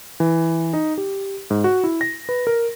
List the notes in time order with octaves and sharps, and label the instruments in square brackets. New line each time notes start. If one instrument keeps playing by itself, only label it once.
[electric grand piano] E3
D#4
G4
G#2
F#4
E4
A#6
B4
A#4